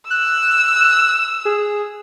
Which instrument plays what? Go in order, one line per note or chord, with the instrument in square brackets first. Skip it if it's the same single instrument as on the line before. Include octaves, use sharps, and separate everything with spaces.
[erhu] E6 [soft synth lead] F#6
[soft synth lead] G#4